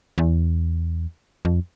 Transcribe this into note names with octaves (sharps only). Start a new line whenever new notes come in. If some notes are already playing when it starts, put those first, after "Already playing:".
E2
F2